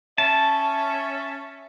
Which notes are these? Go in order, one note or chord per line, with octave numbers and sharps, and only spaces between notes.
C#4 E5 A5